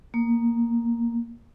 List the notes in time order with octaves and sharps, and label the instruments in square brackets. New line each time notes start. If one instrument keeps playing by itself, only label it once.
[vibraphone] A#3